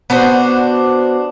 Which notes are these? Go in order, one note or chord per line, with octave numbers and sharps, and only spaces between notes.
B3 D4 F#4 C5